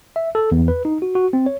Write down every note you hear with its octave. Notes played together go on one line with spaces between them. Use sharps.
E5
A4
E2
B4
D#4
F#4
F#4
C4
C#5